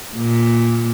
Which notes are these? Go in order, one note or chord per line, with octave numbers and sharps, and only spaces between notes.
A#2